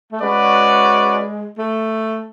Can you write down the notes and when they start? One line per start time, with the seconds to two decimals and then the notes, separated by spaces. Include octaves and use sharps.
0.12 A3
0.22 G#3 C#4 F#4 B4 D5
1.58 A3